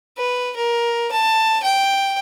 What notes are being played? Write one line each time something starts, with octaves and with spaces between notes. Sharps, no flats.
B4
A#4
A5
G5